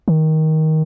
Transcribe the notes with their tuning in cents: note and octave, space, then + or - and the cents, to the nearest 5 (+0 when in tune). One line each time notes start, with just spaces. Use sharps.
D#3 +15